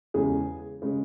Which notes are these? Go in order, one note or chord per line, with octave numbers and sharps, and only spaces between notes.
E2 C#3 G#3 G#4
C#3 G#3